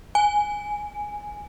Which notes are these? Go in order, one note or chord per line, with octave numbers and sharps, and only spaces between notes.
G#5